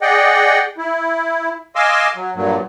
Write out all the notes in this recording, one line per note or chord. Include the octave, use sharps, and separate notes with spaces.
G#4 D5 D#5 F#5 G5
E4
D#5 F5 G#5 C6 D6 E6
F#3
G2 A#2 F#3